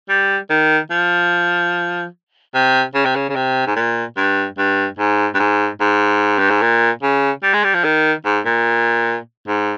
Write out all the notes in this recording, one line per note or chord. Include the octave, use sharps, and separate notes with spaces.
G3
D#3
F3
C3
C#3
C3
C#3
C#3
C3
G#2
A#2
G2
G2
G#2
G2
G#2
G#2
G2
G#2
A#2
C#3
G3
G#3
G3
F3
D#3
G#2
A#2
G#2